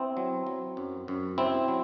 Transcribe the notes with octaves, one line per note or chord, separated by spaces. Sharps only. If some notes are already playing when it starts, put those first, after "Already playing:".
Already playing: B3 C4 E4
F#3
F#3
F#2
F#2
F#3 C4 E4
F#3